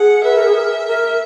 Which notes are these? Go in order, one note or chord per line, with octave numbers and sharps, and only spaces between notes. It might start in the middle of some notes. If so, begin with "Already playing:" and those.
Already playing: G#4 F#5
B4 E5
A#4
G#4
A#4
A#4